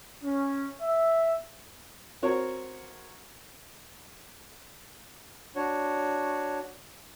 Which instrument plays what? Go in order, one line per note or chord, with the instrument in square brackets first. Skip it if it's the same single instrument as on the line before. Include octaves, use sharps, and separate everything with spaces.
[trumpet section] C#4
E5
[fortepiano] C4 F#4 A#4 C#5
[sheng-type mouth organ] D4 F#4 C#5